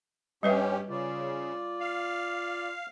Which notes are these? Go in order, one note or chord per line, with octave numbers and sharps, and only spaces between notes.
G2 G3 C#4 G4 B4 E5
C#3 F4 D5
F5